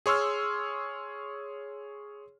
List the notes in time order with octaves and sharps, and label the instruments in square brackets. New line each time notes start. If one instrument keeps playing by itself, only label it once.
[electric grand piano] G#4 C#5 C6 E6 F6